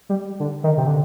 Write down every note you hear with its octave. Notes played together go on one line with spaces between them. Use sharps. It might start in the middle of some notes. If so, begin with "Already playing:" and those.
G3
D3
D#3
C3
D3